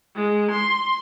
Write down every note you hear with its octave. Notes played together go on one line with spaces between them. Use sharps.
G#3
C6